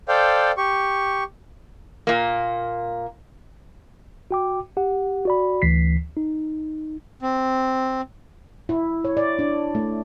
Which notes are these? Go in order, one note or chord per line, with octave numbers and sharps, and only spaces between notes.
A4 C5 D5 F5 G5
G4 C#6
A#2 A#3
F#4 G5 D6
G4 F#5
F#4 D5 B5
D2 E3 B6 C7
D#4
C4
E4
C#5
D5
D4
A3